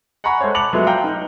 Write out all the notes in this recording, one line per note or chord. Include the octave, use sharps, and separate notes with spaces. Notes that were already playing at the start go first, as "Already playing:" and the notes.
F#5 G#5 A#5 B5 C#6 F#6
G#3 A4 C5 C#5
A5 B5 D6 C#7 F7 F#7
F3 F#3 G#3 A3 B3
F5 G5 A#5 F6 G6
D#4